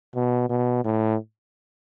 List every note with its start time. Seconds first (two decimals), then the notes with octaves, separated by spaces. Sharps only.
0.15 B2
0.50 B2
0.84 A2